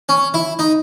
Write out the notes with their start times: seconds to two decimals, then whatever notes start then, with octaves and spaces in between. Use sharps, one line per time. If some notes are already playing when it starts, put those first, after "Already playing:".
0.09 C#4
0.34 E4
0.59 D#4